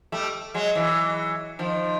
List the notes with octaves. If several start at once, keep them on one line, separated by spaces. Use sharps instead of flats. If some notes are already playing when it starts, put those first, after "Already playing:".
G3 A3
F#3 G#3
E3 F#3
D#3 F3